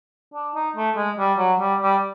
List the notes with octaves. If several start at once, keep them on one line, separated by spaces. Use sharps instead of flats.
D4
D#4
A3
G#3
G3
F#3
G3
G3